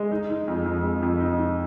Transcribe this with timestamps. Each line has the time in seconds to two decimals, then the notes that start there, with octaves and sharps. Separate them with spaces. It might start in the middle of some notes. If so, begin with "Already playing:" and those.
Already playing: G#3
0.12 D#4
0.30 D#4
0.48 F2
0.66 F2
0.83 G#3
1.02 F2
1.20 D#4
1.39 D#4